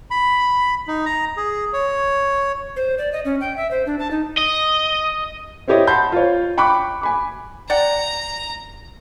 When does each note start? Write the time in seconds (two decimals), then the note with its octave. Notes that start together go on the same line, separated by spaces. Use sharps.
0.11 B5
0.87 D#4
1.05 A#5
1.37 G#4
1.73 C#5
2.76 C5
2.98 D5
3.13 D#5
3.25 C#4
3.41 G5
3.57 E5
3.71 C5
3.86 D4
3.99 A5
4.11 D#4
4.38 D#5
5.68 C4 E4 G4 C#5 D#5
5.87 F#5 A5 B5 C6 G6
6.12 F4 C5 C#5
6.58 G5 B5 C#6 D6 F#6
7.01 G#5 B5 D6
7.70 D5 F#5 G5 A#5